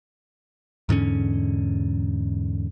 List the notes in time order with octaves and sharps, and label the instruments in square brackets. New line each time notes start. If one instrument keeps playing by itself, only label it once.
[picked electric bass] E2 G#2 D3 C#4